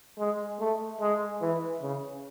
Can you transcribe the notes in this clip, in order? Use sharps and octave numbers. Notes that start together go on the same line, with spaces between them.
G#3
A3
G#3
E3
C#3